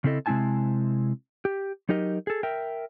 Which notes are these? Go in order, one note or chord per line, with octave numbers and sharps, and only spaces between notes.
C#3 C4 E4 A4 D#5
C3 G#3 C4 E4 G#5 A5
G4
F#3 D#4 G4 A#4 D#5
G#4 A4
A#4 E5 G5